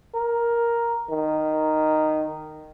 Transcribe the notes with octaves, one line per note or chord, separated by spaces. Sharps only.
A#4
D#3